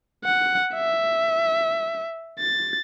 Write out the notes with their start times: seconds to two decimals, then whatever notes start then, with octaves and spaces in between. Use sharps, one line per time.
0.24 F#5
0.74 E5
2.39 A6